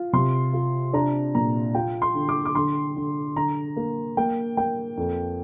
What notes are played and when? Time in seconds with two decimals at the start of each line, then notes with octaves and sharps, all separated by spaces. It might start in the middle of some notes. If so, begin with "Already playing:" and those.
Already playing: F4
0.13 C3 C6
0.53 F4
0.93 D4 A#5
1.35 A#2 A#5
1.74 F4 G5
2.02 C6
2.15 D3
2.29 D6
2.46 D6
2.55 D3 C6
2.96 D3
3.36 D3 A#5
3.76 A#3
4.17 A#3 G5
4.57 A#3 G5
4.97 F2